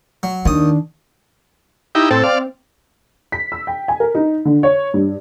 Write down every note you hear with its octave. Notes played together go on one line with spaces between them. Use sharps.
F#3
D#2 D#3 D4 D#6
D#4 E4 G4
A2 C4 A4
D5 F5
B6
E6
G5
G#5
A#4
D#4
D3
C#5
G2